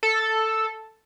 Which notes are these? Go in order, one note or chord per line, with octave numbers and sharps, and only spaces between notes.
A4